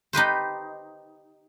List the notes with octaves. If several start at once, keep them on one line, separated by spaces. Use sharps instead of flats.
D#4 G4 B4 C5